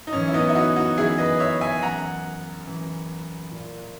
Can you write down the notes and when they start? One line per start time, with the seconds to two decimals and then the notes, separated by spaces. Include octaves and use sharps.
0.07 D#4
0.13 F#2 E3 C#4
0.28 E4
0.34 B3 D#4
0.49 E4
0.55 D#4 F#4
0.76 D#4 F#4
0.98 F#2 E3 E4 G#4
1.18 B4 D#5
1.40 C#5 E5
1.61 E5 G#5
1.82 F#2 E3 F#5 A#5
2.67 F#2 E3
3.51 A#2